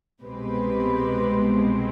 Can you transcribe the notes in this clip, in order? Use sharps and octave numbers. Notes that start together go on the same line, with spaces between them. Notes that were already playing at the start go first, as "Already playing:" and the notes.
C2 B2 G#3 C4 G4 B4